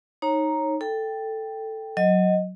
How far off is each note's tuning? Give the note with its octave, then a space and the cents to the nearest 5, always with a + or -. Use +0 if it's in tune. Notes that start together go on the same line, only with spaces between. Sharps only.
D#4 +0 C#5 -25 A#5 +0
A4 +5 G5 +0
F#3 +0 D#5 +0